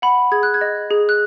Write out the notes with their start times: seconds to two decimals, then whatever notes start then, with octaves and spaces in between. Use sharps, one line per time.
0.02 F#5 B5
0.32 G#4 G#6
0.43 F#6
0.54 G#6
0.61 D#5
0.90 G#4
1.09 F#6